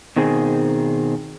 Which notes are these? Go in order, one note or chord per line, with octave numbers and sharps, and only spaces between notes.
B2 D#3 C4 G#4